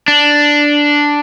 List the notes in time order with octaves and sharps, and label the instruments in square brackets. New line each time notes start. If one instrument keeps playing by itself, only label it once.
[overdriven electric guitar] D4